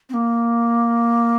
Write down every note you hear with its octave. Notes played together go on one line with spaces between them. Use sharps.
C4
A#3